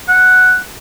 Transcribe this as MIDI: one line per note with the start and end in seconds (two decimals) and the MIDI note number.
0.08 0.57 78